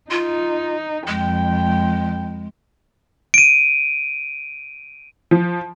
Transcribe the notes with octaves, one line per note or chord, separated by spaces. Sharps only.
D#4 F4
F2 G#3 G5
D7 D#7
F3